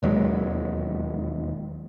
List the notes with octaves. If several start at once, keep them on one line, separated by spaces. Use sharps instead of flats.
E1 D#2 F#3 G#3